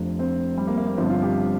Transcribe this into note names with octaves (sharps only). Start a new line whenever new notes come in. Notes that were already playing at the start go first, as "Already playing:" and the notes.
Already playing: F1 F2 F3 D4
C4
G3
A#3
A#3
A#3
G1 G2 F3 C4
F4
G4